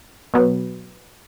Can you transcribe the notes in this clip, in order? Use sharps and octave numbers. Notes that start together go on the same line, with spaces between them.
B2 F#3 B3